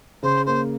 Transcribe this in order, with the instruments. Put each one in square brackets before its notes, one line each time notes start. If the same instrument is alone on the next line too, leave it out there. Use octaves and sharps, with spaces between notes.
[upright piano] C#3 [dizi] C5
[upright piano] A#3 [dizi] C5